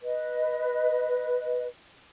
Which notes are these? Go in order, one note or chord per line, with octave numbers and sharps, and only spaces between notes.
B4 D#5